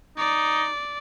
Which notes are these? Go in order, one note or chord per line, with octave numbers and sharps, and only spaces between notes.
D#4 D5